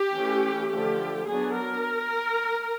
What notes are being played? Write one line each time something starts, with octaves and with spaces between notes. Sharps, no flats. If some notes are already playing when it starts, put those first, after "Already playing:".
Already playing: G4
E3 A3 C#4
D3 F3 A3 G4
F#3 B3 D4 G#4
A#4